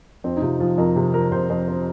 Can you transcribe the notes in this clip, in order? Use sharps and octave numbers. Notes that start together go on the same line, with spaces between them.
F2 C4
D#4
C3 F4
F3 F4
F2 A#4
C3
F3 A#4
C3 C5
F2 C5
C5